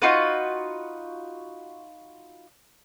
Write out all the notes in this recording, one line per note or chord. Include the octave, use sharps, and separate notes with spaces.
D#4 F4 F#4 B4